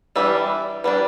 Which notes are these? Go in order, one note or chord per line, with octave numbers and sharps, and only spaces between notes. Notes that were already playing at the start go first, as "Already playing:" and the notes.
E3 G3 D4 E5
E3 G3 D4